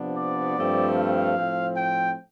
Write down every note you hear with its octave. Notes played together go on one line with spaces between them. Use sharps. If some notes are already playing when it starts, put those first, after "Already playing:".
Already playing: C3 F3 B3 D4
D5
G2 F3 A3 C4
F5
A2 F3 C4
G5